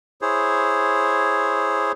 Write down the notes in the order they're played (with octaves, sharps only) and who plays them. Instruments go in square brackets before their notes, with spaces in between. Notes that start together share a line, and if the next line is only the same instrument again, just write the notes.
[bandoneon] E4 G#4 C5 C#5